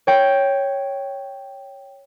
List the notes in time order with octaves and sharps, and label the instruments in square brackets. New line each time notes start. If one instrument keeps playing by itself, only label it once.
[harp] C#5 G5